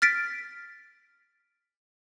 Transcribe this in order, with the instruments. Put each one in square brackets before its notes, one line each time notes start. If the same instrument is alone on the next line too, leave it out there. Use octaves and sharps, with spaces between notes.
[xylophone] F6 A6 B6 D7